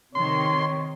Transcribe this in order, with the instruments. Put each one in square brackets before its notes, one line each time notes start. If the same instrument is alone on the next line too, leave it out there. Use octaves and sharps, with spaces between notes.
[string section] C3 D#3 [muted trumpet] C#5 [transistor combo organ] C6